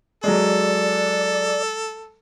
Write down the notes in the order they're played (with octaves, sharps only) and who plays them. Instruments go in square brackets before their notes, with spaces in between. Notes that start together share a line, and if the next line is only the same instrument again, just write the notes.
[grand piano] F#3 G#3 [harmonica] A4 [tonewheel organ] D5